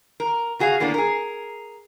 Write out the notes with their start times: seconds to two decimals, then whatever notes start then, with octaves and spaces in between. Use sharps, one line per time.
0.20 A#4
0.59 C#3 F#4 G#4 D5 F5
0.80 A2 A#3 B3 D4
0.94 G#4 A#4